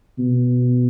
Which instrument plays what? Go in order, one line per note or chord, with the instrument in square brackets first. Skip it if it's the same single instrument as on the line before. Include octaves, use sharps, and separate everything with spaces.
[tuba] B2